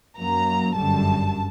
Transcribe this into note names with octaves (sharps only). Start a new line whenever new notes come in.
F#2 F#3 A#3 A#5
G1 F#2 D3 G3 A5